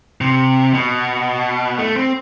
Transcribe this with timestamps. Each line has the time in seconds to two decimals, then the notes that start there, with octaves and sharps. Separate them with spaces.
0.21 C3
0.74 B2
1.79 A3
1.96 C4